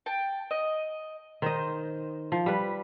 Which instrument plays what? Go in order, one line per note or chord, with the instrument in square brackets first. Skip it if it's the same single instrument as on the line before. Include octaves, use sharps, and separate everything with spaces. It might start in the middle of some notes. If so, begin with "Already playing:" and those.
[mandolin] G5 A5
D#5
[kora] D#3 D#5 [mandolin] C5
[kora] F3
G3 B4